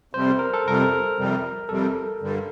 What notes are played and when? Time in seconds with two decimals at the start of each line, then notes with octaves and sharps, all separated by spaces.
0.13 F2 C3 G3 C5
0.39 A#4
0.53 A4
0.65 F2 C3 G3 A#4
1.17 F2 C3 G3
1.69 F2 C3 G3 A4
2.21 G2 D3 G3